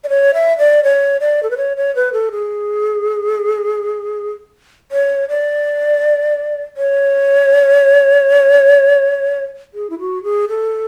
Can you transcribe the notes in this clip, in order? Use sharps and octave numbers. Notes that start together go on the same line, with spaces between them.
D5
C#5
E5
D5
C#5
D5
A4
B4
C#5
C#5
B4
A4
G#4
C#5
D5
C#5
G#4
E4
F#4
G#4
A4